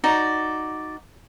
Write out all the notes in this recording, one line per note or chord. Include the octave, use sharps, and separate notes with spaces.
D#4 F#4 D5